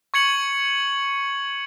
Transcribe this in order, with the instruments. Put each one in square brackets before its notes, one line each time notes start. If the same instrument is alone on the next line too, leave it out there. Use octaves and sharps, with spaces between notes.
[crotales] C#6 G#6 C#7 F#7